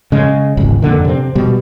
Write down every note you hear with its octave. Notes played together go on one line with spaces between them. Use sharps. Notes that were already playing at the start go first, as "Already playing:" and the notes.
C#3 G#3
D#1 G#1 C#2
F2 A#2 D3 D#3
C3 C4
B2 G3